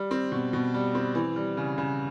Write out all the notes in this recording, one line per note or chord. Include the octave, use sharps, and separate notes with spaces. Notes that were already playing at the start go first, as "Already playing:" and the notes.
Already playing: G3
C4
B2
B2
G3
C4
E3
G3
C#3
C#3